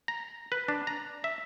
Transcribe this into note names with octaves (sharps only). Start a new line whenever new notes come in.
A#5
B4
D4
A#5
E5